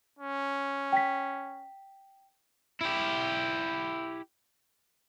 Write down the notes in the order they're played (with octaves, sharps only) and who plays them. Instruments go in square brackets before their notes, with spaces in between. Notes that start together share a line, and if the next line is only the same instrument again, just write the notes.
[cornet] C#4
[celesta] G5 B6
[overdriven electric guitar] E4 G4